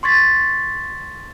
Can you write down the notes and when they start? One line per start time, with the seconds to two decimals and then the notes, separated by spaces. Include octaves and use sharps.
0.03 C6 C#6 G#6 A6 B6